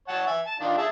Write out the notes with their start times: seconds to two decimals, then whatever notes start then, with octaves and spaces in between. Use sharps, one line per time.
0.08 C#5 F#5 A5
0.27 E5 G#5
0.46 A5
0.60 D#3 D4 F4
0.78 G#4 E5 A5